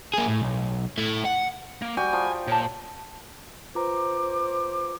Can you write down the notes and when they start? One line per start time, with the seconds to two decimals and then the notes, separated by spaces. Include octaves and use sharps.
0.14 A#3 G#4
0.28 A2
0.42 B1
0.98 A3 E4
1.25 F#5
1.82 A#3
1.97 G3 F#4 G5 G#5
2.13 F3
2.48 A#2 C#5 A5
3.75 F4 B4 C5 A#5 D6